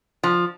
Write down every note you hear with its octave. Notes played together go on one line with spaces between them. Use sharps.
F3